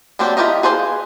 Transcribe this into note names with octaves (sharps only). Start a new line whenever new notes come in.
F#3 A#3 C4 D4 G4
E4 F4 G4 A#4 D#5
G#4 B4 C5 E5 F5